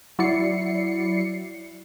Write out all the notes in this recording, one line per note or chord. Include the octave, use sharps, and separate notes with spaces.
F#3 E4 D5 C7 C#7